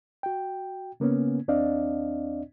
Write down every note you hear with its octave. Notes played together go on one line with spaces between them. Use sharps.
F#4 G5
C#3 A#3 B3 C#4
D#2 C4 D4 D5 D#5 F5